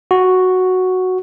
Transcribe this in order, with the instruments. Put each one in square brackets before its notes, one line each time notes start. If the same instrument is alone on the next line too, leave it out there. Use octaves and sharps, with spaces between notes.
[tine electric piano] F#4